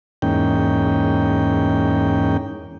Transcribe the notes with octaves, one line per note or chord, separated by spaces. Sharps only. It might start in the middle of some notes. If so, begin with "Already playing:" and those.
E2 G#2 A#3 C#4 D#4 G5